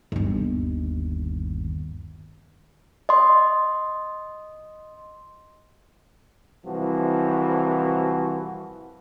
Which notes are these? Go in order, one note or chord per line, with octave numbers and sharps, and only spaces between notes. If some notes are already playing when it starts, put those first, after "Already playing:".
G1 D#2
D#5 C6
C2 E3 F3 F#4